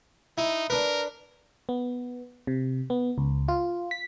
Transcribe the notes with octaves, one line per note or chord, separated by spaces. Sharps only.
D#4 E4
D4 A#4 B4
B3
C3
B3
C#2
F4
B6